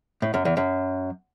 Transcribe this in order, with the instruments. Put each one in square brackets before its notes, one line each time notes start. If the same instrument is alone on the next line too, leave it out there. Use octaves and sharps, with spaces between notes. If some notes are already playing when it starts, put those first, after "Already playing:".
[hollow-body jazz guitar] A2
F#2
E2
F#2